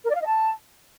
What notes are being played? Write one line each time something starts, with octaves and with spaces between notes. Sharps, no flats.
A#4
D5
F5
D#5
A5